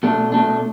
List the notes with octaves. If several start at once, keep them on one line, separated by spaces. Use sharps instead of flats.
B2 A3 D4
B2 A3 D4